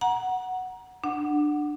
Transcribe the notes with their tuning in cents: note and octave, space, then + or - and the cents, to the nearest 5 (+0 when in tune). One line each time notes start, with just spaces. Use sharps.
F#5 +0 A#5 +25
D4 +20 F#5 +0